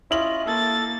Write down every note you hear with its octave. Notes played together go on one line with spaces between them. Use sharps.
C#4 E4 F4 D#5 F#7
A#3 A4 A6